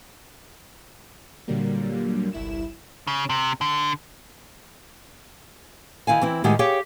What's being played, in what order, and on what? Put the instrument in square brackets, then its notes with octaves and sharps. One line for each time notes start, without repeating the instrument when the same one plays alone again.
[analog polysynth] A#2 D3 F#3 G3 A#3
G1 C2 E4 E7
[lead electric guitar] C#3
C3
D3
[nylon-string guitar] D#3 E4 F5 G#5
E3 C4 E4
A2 D#3 G#3 E4 G4 F#5
G4 G#4 C#5 F5 G5